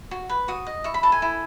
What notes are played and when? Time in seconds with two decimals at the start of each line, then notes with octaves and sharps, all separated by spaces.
0.11 F#4
0.29 B4
0.48 F#4 D#6
0.67 D#5
0.84 E4 C#6
0.94 B5
1.03 A4 A5
1.12 G#5
1.22 E4